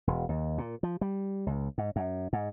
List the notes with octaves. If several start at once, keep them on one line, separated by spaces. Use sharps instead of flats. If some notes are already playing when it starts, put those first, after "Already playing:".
E1
D#2
A#2
F3
G3
C#2
G#2
F#2
G#2